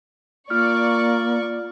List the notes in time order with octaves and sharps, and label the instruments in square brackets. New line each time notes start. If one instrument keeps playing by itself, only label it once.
[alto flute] A#3 [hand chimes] F4 F6 F#6 [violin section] D5 C#6